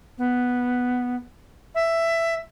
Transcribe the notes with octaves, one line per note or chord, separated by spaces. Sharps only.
B3
E5